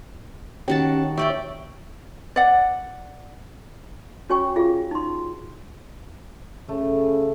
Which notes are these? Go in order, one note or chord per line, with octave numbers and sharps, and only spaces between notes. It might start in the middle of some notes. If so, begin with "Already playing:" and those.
D#3 C#4 F#4 G4 A5
G4 C#5 D5 E5 G5
D5 F#5
C#4 F#4 C#5 G5 G#5 C#6
F4 G#4 F5
D#4 C6
C#3 A3